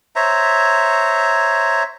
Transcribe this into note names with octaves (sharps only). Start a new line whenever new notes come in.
C5 C#5 E5 A#5